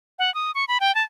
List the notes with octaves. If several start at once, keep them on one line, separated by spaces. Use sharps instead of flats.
F#5
D#6
C#6
B5
G5
A5